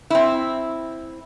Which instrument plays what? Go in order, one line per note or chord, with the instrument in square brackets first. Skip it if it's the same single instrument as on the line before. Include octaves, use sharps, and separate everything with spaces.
[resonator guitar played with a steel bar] C4 E4